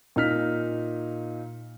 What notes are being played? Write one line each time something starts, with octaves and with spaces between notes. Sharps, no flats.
A#2 D#4 F6 B6